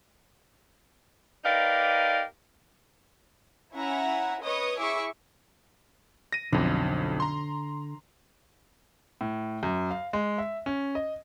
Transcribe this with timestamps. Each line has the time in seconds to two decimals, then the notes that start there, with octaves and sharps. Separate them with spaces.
1.45 D#4 G4 A#4 B4 D5 F5
3.74 C#4 E4 E5 F#5 G#5 A#5
4.41 B4 C#5 D#5 C#6 D#6
4.78 E4 G#4 E5 C#6 D6
6.33 A#6 D#7
6.53 B1 F2 D3
7.20 A#5 C6
9.21 A2
9.63 F#2
9.91 F5
10.13 G#3
10.38 E5
10.66 C#4
10.95 D#5